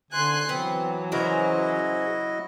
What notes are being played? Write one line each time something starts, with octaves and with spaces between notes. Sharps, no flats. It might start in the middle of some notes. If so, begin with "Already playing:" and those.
D3 G#5 C6 F#6
E3 F#3 B3 C4
C#3 E4 F#4 A#4 C5 D#5